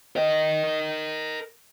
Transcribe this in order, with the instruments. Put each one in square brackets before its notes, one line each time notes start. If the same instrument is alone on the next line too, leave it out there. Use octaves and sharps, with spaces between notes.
[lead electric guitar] A#4 D#5